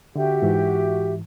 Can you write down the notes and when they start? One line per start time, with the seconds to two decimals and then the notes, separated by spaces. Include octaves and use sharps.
0.16 D3 F#4 G4 E5
0.42 G#2 E3